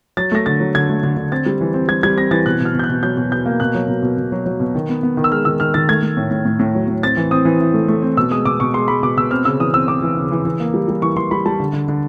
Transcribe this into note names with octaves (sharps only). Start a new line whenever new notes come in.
F#3 A6
A3 A#6
D3 A6
F#3
D3 G#6
A3
D3
D3
C4 A6
G3
E3
C4
G3 G#6
G3 G#6
C4 A#6
E3 A6
B2 F#6
B2
F6
B2
G6
F#6
B2
F#3 G6
B2
B2 G6
A#3
B2 F#6
F#3
B2
B2
B2
F#3
F#3
B2
D#3
B3
B3
D#3
E6
G#3 F6
D#3 E6
D#3 F6
D#3 A6
A3 G#6
A3
A2
A2
A2
A2
F#3
A2
C4 A6
E3
C4 D#6
E3
E3
A3
A3
C4
B2 E6
G#3 D#6
B2 D6
B2 C#6
G#3 C6
G#3 B5
B2 D6
B2 E6
C4 F6
C#3 E6
E3 D#6
C4 E6
C4 D6
E3
C#3
E3
E3
A#3
G3
G3
E3 C#6
E3 C6
G3 B5
G3 A5
D3
D3
D3